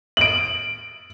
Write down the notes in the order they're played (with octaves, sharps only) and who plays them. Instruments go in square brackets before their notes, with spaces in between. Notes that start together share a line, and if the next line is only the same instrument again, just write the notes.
[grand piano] D7 F#7